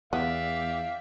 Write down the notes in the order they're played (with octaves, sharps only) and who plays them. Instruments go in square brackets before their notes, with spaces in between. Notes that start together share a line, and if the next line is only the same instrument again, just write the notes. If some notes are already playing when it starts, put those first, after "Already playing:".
[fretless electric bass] E2 [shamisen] B3 [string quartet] D5 E5 G5 [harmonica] F5